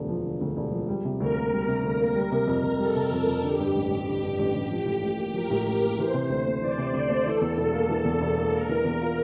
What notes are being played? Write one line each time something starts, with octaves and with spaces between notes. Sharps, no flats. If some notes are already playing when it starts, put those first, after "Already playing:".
Already playing: E1 D2 D3
F3
D3
D2
E1
F3
G3
C3
D2 A#4
A#3
G3
C3
D2
A#3
G3
C3
F2
F2
G3 A4
C3
F2
F2
D3 G4
G2
A1
A1
D3
G2
A1
A1
F3
A2
A1
A#3
F3 A#4
A2
A1
A#3
E3 C5
C3
D2
A3
E3 D5
C3
D2
A3
E3 A4
E2
E1
A#3
E3 A4
E2
E1
A#3
A#3 A#4
E3
E2
F4